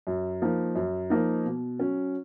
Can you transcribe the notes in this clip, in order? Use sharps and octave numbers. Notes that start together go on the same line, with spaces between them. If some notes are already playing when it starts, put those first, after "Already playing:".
F#2
F3 A#3 D#4
F#2
F3 A#3 D#4
B2
F#3 C#4